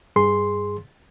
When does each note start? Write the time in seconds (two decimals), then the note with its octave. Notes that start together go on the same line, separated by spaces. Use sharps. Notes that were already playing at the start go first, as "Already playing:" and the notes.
0.16 G2 G#4 C6